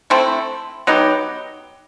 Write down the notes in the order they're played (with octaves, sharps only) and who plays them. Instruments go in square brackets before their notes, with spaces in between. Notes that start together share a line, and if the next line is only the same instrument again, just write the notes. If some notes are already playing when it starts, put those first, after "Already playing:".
[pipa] A3 C4 E4
F#3 B3 D#4 G4